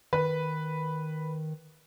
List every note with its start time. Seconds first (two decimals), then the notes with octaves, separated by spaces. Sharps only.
0.13 D#3 B4